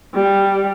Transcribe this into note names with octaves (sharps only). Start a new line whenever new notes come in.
G3